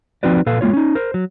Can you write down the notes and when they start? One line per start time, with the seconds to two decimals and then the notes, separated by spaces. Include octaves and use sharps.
0.23 F3 C4 D#4 F#4 B4 D5
0.46 A#2 A4 B4 F5
0.61 G#3 A#3 F4 C#5
0.73 C#4 D#4
0.95 A#4 C5
1.14 F#3